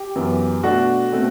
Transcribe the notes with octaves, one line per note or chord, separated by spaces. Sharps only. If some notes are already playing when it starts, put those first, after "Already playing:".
Already playing: G4 G5
F#2 E3 B3
B2 A3 D4 F#4 F#5
B2 A3 C4